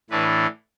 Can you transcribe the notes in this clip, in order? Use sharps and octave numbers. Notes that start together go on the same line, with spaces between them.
A2 E3 A3 D4 B4